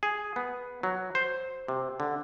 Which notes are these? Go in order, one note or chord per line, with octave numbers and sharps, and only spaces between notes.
G#4
B3
F#3
C5
C3
D3